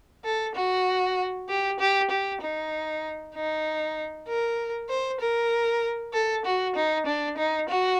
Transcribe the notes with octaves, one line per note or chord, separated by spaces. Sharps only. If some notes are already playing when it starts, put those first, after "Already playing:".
A4
F#4
G4
G4
G4
D#4
D#4
A#4
C5
A#4
A4
F#4
D#4
D4
D#4
F#4